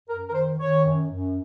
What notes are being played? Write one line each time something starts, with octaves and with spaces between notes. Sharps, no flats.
F#2 A#4
A#4
D#3 C5
D#3 C#5
F#2
F#2